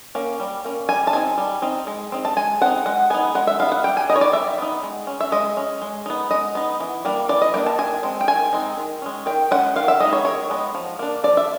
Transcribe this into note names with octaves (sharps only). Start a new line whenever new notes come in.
A#3 C#4
G3
A#3 C#4
G3 G#5
A5
C4 D#4 G#5
G3
C4 D#4
G#3
C4 D#4
A5
G#3 G#5
C4 D#4 F#5
G#3 F#5
B3 D#4 G#5
G#3 F#5
E5
B3 D#4 F5
F#5
G3 G5
G#5
B3 D#4 C#5 D#5
D5
G3 E5
B3 D#4
G#3
C#4
E5
G#3 D#5
C#4
G#3
B3 D#4
G#3 D#5
B3 D#4
E3
G3 A#3 D4
E3 D5
D#5
G3 A#3 D4 G5
A5
D#3 G#5
G#3 C4
G5
D#3 G#5
G#3 C4 D#4
D#3
G#3 C#4
D#3 G5
G#3 C#4 F#5
D#3 F5
E5
G#3 B3 D#4 D#5
C#5
D#3 C#5
G#3 B3 D#4
F3
A#3 D4
F3 D5
E5